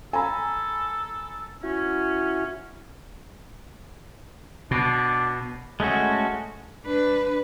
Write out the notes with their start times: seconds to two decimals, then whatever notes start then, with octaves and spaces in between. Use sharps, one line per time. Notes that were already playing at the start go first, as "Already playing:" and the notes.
0.13 A4 G#5 A#5 B5
1.63 C#4 E4 F#4
4.71 B2 D4
5.80 G#3 A3 C#4 F#4
6.85 D4 B4